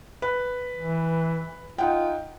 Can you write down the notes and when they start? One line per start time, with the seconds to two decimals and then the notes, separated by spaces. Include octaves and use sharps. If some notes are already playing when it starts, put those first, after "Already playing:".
0.22 B4
0.78 E3
1.78 D#4 F4 F#5 G5